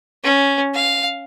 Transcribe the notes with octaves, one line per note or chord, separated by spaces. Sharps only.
C#4
F5